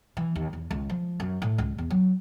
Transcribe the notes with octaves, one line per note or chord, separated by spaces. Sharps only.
E3
D#2
E2
C#2
F3
F#2
A2
C#2
E2
F#3